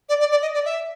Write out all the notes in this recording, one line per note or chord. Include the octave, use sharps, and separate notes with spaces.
D5
D5
D5
D#5
D5
E5